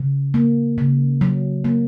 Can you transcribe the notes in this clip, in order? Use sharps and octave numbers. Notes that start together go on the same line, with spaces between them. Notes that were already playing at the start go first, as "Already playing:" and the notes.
Already playing: C#3
A#3
C#3
F#3
A#3